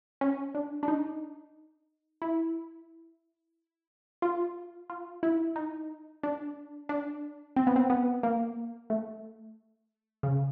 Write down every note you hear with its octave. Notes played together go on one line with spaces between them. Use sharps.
C#4
D4
D4
D#4
E4
F4
F4
E4
D#4
D4
D4
C4
B3
C4
B3
A#3
A3
C#3